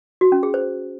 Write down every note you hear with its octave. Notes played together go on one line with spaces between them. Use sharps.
F#4
C#4
G#4
C5